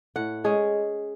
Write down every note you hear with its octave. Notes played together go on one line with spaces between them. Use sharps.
A2 F#5
G#3 C#4 G#4